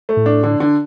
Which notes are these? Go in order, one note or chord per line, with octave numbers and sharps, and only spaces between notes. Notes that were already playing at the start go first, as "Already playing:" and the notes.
A3
A2
D4
D3
D3